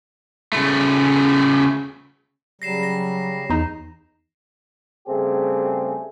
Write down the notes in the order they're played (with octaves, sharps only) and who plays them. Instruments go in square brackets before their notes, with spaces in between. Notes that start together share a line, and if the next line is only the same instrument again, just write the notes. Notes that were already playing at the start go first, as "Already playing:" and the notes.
[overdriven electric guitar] C#3 A3
[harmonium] C#3 G3 [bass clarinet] F#3 [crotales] A#6 C7 E7
[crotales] A#6
[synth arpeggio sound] E2 D#4
[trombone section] C#3 G3 A3 C4 G4 G#4